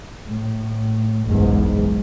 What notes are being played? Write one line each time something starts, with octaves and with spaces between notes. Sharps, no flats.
A2
F#1 B1 E2 G#2